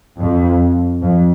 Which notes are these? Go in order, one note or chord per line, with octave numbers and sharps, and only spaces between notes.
F2
F2